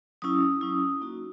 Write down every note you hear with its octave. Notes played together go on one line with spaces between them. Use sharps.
F#3 C#4 E4 D#6
F#3 C#4 E4
A#3 D#4 F#4